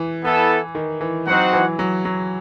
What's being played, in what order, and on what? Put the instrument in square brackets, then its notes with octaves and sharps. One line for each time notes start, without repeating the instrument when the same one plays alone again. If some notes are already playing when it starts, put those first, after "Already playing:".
Already playing: [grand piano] E3
[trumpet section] B3 E4 A4
[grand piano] D#3
E3
[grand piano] F#3 [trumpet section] C4 D#4 F#4 C5 F#5
[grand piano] E3
F#3
F#3